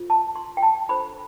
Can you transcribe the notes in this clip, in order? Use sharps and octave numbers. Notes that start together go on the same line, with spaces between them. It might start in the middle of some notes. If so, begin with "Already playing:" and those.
Already playing: F4 A4 C5
A5
C6
G5
A5
D4 A4 C5 B5